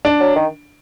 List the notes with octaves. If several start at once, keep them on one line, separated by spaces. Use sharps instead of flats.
D4
F#3
D#3